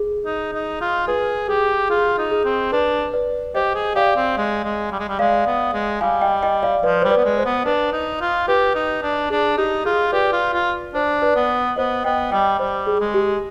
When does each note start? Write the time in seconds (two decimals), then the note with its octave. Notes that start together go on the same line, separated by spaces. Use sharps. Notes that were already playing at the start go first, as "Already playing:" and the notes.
Already playing: G#4
0.26 D#4
0.53 D#4
0.81 F4
1.07 G#4 B4
1.48 G4 G#4
1.90 F4 G#4
2.18 D#4
2.31 G#4
2.45 C4
2.72 D4 B4
3.13 B4 D5
3.55 G4 C5 D#5
3.75 G#4
3.95 G4 D5 F5
4.16 C4
4.37 G#3
4.64 G#3
4.92 G3
5.00 G#3
5.09 G3
5.19 G#3 D5 F5
5.46 B3
5.73 G#3
6.01 G3 F5 G#5
6.21 D#5 G5
6.42 D#5 G5
6.63 D5 F5
6.83 F3 B4 D5
7.02 G3 C5
7.10 B4 D5
7.17 B3
7.24 G#3
7.38 C5
7.45 B3
7.65 D4 B4
7.93 D#4
8.21 F4
8.48 G4 B4
8.75 D#4
9.02 D4
9.30 D4 G#4
9.57 D#4 G4
9.85 F4 G#4
10.12 G4 B4 D5
10.32 F4
10.54 F4
10.94 D4 C5
11.22 B4 D5
11.36 B3
11.76 B3 C5 D#5
12.04 B3 D#5 G5
12.31 G3 D#5 G5
12.59 G3 C5
12.87 G#4
13.00 G#3
13.14 G4